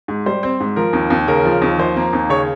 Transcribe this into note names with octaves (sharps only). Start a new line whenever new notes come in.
G#2
G3 C5
C4
G#2
F3 A#4
D#2
D#2
C#3 A#4
F3
D#2
F3 C5
A#3
D#2
C#3 C#5